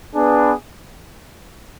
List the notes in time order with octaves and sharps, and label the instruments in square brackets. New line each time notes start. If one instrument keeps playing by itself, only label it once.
[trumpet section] B3 D4 G#4 B4